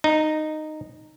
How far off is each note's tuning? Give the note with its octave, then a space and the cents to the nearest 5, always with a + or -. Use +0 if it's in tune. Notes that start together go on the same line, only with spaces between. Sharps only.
D#4 -10